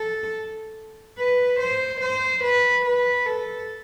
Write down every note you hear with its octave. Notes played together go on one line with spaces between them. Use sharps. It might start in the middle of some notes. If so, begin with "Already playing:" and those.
Already playing: A4
B4
C5
C5
B4
B4
A4